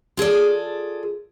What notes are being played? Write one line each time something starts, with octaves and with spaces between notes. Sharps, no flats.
F4 G#4 A4 D5